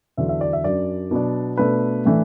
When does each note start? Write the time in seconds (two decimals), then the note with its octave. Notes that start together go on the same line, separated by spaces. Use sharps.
0.17 E2 D3 F#3 D4 E5
0.29 E5
0.41 D5
0.53 E5
0.64 F#2 F#3 D4 D5
1.11 B2 F#3 B3 D4
1.57 B2 A3 D4 B4
2.05 A2 E3 A3 D4